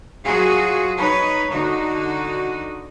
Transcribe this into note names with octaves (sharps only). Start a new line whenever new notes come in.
F#3 F4 F#4 G#4
D#4 B4 C#5
D3 D#4 F#4